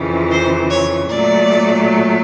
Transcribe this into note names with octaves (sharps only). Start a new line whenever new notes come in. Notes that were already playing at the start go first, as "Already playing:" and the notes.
Already playing: F2 C#3 E3
C5
C#5
A#2 F#3 A3 D5